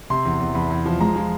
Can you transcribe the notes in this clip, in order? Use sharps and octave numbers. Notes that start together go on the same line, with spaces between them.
C3 C6
E2
E2
E2 B5
E2
F3
G#3 A#5
F3